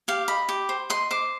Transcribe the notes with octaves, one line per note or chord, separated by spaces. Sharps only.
G4 F5
D#5 B5
G4
C5
D#5 C6
C5 D6